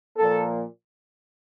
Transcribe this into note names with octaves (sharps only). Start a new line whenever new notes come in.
A#2 F3 A#3 A4